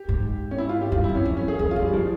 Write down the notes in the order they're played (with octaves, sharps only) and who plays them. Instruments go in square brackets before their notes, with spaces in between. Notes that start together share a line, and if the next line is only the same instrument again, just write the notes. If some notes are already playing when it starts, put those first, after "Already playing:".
Already playing: [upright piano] G4
[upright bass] G#2
[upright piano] C#4
E4
F4
G4
[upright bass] G2 [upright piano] F4
[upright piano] E4
[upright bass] E2
[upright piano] C#4
[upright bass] F2
[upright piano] C#4
G#4
[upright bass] F2 [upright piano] G#4
[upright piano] F4
[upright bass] G2
[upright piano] G3
F3